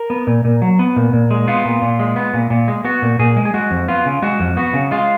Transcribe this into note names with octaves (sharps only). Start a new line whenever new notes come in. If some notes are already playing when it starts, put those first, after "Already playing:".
Already playing: A#4
B3
A#2
A#2
F#3
B3
A#2
A#2
G#3
B3 F4
A#2
A#2
G#3
B3
A#2
A#2
G#3
B3 F#4
A#2
A#2 G#4
G#3
G#4
G#3 F#4
F2
B3 F4
C#3
G#3 F#4
F2
B3 F#4
C#3
G#3 F4